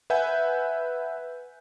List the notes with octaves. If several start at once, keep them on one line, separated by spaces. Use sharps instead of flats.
B4 E5 F#5 G#5 G6